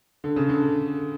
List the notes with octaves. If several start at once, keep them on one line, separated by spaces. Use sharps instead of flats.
D3
C#3
D3